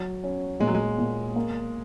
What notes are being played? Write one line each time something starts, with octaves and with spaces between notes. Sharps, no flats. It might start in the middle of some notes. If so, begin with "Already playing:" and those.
Already playing: F#3
C#4
A#2 G#3
F#3
G#3
A#2
A#3